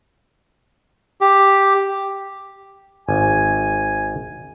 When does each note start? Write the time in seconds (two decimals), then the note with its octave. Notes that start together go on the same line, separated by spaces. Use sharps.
1.21 G4
3.09 G#1 G#5